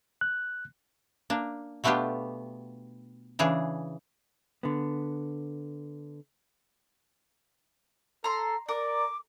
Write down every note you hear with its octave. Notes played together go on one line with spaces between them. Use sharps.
F#6
A#3 D4
B2 A3 B3 D4 F4 G4
C#3 E3 D4 G#4
D3 B3
A4 A#5 C6
A#4 D5 D6